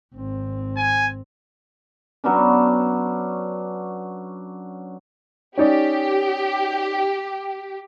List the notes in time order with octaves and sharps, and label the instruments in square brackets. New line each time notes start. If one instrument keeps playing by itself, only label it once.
[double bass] G#1 C4
[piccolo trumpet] G#5
[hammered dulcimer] F#3 B3 C#4 D4
[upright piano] C#4 D#4 D5 [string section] G4